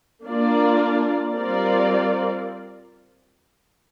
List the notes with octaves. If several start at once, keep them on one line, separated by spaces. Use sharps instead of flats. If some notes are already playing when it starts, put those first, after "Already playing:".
A#3 D4 F4 A#4 D5
G3 C4 F4 A#4 D5